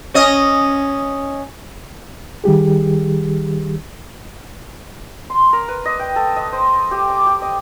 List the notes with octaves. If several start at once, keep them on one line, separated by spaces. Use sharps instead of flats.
C#4 D#5
D#3 G3 G4 G#4
C6
A#4
B4
D#5
G5
A4
D#5
C5
G4
D6
G4
D#5